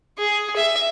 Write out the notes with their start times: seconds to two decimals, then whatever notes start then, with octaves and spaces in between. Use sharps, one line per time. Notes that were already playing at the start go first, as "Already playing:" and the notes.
0.18 G#4
0.56 E5